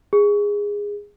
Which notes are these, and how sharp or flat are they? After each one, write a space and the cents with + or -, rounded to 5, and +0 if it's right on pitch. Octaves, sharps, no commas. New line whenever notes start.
G#4 -15